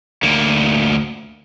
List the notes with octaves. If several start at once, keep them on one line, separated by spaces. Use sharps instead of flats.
D2 A#3